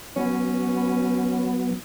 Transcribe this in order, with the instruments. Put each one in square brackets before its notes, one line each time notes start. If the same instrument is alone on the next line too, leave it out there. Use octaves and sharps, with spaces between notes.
[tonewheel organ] F#3 B3 [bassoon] C#4